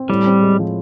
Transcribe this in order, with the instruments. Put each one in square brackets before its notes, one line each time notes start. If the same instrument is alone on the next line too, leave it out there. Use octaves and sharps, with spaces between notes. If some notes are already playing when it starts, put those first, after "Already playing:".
Already playing: [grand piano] C4
[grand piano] A2 [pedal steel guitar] G3
[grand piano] C4
G#3
F3